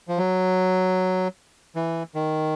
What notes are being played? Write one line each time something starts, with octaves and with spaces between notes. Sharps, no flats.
F3
F#3
E3
D#3